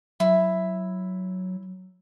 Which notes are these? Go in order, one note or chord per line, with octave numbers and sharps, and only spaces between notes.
F#3 E4